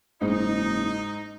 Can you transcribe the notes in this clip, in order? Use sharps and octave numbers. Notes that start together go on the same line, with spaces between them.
F#1 G#2 D#4